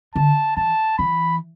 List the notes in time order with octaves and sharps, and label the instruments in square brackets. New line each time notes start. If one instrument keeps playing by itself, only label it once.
[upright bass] D3 [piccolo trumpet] A5
[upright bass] E3 [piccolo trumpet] A5
[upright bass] E3 [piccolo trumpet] B5